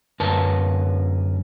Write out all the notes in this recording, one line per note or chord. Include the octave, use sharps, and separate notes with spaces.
F#2 D3 A#4 B4 A5